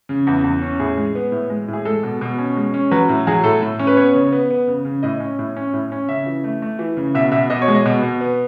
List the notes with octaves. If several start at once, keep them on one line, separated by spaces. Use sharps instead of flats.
C#3
E2
E2
C#4
A2 G#4
G#3
B3
A2
G#3
A2
G#4
G#3 A4
B2
B2
C#4
G#3
C#4
F#3 B4
A2
F#3 G#4
A2 A4
A2
C#4
B4
B3 C#5
C#3
B3
B3
C#3
C#3
A2 D#5
C#4
A2
C#4
A2
C#4
C#3 E5
E3
A3
A3
E3
C#3
B2 E5
B2 E5
B2 D#5
C#5
G#3
D#5
B2
B2
B3